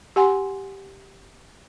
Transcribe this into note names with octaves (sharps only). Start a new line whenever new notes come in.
G4 F#5 G#5 C6